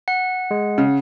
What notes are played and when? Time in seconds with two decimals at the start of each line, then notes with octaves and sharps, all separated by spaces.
0.08 F#5
0.51 G#3
0.78 C#3